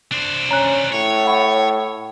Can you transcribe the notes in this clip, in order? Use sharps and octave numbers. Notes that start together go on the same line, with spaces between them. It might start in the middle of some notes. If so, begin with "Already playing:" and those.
D4 C5
C#4 A#5 F#6
A2 C#5
F#5 B5 C#6